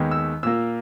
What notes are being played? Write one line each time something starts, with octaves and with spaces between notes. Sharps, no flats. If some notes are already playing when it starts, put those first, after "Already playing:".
Already playing: D#2 D#3 G#3 B3
E6
A#2 A#3 E6